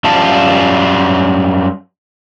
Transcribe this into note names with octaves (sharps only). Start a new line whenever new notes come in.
F#2 G3 F4 A5